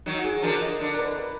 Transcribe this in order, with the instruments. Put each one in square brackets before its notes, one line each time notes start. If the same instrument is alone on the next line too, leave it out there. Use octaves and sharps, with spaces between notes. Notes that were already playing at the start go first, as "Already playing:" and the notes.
[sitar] D#3 F#3
[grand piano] F#4
G#4
[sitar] D3 F3 [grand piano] A#4
[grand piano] D#5
[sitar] D3 [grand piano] D5
[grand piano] A#4
B4
B4